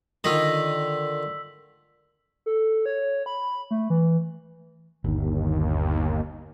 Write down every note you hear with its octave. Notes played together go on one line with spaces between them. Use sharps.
D3 D#3 F4 D#5 E6 B6 F#7
A4
C#5
B5
A3
E3
G1 D#2